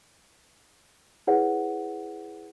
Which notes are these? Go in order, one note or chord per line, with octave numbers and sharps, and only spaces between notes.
E4 G#4 B4 C#5 F#5